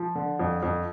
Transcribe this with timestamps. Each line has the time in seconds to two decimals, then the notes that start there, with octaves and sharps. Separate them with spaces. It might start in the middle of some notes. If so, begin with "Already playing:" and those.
Already playing: F3
0.15 D3
0.40 F2
0.63 F2